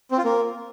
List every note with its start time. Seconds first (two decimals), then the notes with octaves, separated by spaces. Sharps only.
0.12 C4
0.18 F4
0.24 A#3